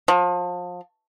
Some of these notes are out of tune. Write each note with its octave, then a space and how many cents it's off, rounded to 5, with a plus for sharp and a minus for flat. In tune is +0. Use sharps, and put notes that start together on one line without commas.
F3 +30